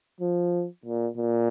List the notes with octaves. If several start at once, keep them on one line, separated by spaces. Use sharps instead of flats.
F3
A#2
A#2